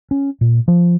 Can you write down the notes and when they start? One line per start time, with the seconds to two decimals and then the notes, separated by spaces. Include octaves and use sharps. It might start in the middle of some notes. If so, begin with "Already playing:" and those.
0.11 C#4
0.41 A#2
0.68 F3